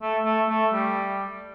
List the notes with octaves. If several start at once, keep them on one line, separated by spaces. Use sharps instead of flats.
A3
A3
A3
G3